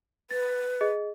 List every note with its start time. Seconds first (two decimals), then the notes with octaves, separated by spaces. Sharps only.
0.31 B4 A6
0.81 G#4 D#5